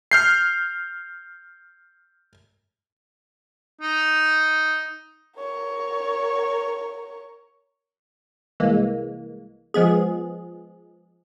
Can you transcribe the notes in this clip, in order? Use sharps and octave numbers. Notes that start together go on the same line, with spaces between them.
F6 G6 C7
D#4
A#4 C#5
C2 E3 G#3 A#3
F3 G#3 B3 G#4